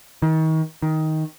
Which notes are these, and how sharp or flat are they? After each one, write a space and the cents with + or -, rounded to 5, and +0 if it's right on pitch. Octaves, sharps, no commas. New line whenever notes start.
D#3 +35
D#3 +15